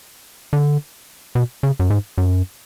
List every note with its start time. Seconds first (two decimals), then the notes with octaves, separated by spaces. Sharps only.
0.53 D3
1.35 B2
1.63 C#3
1.80 F#2
1.90 G#2
2.18 F#2